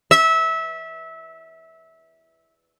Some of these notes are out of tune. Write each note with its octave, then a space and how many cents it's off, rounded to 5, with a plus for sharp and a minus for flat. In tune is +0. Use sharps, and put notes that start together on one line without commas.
E5 -20